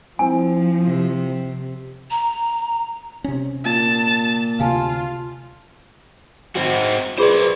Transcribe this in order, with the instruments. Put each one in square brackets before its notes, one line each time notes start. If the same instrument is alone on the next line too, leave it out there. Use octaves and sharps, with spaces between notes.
[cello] F3 [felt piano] C4 E4 [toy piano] G#5
[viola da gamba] C3
[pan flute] A#5
[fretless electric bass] C3 C#4
[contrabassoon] A#2 [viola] A5
[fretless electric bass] D2 C3 [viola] F4 [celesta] F5 G#5 A5
[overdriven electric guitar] C4 F#4
[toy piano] F4 G#4 B4 [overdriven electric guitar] C5 D5